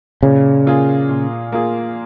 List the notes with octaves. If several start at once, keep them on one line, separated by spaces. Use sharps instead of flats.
A#2 C#3
A#3 F4 G#4
A#2
A#3 F4 G#4